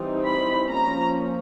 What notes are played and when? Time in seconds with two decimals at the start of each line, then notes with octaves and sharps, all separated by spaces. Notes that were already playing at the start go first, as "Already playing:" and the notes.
Already playing: E3 G3 C4 D#4
0.24 B5
0.71 F3 A#3 C#4 A#5